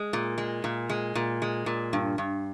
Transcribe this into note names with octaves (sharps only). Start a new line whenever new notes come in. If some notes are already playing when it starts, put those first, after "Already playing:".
Already playing: G#3
A#2
G#3
A#2
G#3
A#2
G#3
A#2
G2
G2